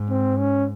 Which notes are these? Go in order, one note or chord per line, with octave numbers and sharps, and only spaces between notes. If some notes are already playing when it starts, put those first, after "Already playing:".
Already playing: G#2
C4
C#4